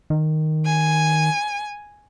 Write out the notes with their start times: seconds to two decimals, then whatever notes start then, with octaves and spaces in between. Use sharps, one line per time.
0.10 D#3
0.66 G#5